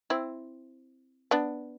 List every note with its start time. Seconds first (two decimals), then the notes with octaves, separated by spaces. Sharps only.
0.10 C4 E4
1.31 B3 D4